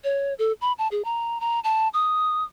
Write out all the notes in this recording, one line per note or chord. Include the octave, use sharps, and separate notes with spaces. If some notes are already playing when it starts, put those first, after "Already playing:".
C#5
A4
B5
A5
G#4
A#5
A#5
A5
D#6